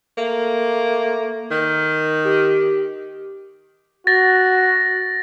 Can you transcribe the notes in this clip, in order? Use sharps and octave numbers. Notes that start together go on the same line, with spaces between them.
A3 A#3
D#3
G4
F#4 A6 A#6